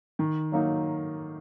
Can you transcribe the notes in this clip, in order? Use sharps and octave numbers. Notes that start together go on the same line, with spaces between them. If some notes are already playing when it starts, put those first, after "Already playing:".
D#3
F#3 A#3 D#4